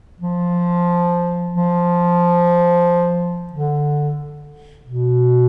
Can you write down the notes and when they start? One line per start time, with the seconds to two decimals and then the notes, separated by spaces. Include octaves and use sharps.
0.21 F3
1.54 F3
3.53 D3
4.86 B2